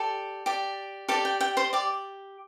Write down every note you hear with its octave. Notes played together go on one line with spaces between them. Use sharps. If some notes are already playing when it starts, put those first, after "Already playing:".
Already playing: G4 A4 D5 A5
G4 D5
G4 A4 D5 A5
G5
G5
C5 C6
G4 D5 D6